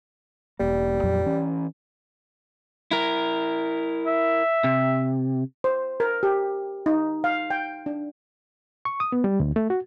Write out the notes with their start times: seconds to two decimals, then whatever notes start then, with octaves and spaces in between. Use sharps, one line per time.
0.60 E1 G3 A#3
1.04 F2 A#2 F#3
1.26 E3 C#4
2.91 E4 A#4
4.07 E5
4.64 C3
5.64 C5
6.00 A#4
6.23 G4
6.86 D#4
7.24 F5
7.50 G5
7.86 D4
8.85 C#6
9.00 D#6
9.12 B3
9.24 G3
9.40 D2
9.56 A3
9.70 F#4